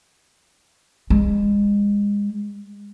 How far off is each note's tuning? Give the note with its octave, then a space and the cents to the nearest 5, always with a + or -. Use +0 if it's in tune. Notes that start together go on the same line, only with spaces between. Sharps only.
G#3 -30